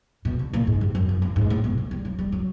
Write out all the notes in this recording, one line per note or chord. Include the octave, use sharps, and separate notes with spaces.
B2
D3
A#2
G#2
G2
F#2
F#2
G2
G#2
A2
B2
E3
G3
F#3
G3
F#3